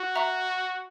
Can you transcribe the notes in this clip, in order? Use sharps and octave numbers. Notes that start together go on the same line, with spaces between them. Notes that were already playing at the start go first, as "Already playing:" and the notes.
Already playing: F#4
E5 A#5 C#6 F#6